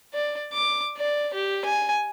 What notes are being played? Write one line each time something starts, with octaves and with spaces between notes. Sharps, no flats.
D5
D6
D5
G4
G#5